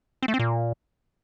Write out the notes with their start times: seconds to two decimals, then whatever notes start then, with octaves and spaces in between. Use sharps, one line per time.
0.23 C4
0.28 A3
0.34 C4
0.39 A#2